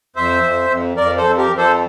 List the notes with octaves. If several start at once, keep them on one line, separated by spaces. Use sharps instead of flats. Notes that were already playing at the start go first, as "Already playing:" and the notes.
F2 C5 E5
F2
F2
F2 A#4 D5
A4 C5
F2
G4 A#4
F2
A4 C5